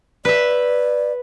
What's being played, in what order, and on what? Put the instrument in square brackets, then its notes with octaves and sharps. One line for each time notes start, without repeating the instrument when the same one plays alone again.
[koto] B4 E5 [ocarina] D5